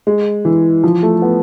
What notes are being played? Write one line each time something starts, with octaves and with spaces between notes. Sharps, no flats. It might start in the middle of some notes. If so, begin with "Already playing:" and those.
G#3
E3
F3
A3
B3